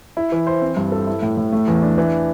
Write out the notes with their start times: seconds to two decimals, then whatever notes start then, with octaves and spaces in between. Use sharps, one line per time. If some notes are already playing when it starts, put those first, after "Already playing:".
0.17 E4
0.32 E3
0.47 C5
0.62 C4
0.77 G2
0.92 A4
1.07 E4
1.22 A2
1.37 A2
1.52 A3
1.67 E2
1.82 D4
1.98 E3